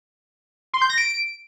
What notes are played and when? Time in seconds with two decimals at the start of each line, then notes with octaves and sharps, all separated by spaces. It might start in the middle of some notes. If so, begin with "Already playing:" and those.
0.73 C6
0.82 G6
0.90 A#6
0.98 D7